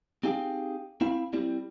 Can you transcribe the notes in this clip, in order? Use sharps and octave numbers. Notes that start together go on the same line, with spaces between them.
C4 D#4 G4 G#4 F5 G5
C4 E4 F5 B5
G3 C4 E4